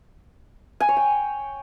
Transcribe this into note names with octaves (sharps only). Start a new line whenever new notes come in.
G#5
C#5
G5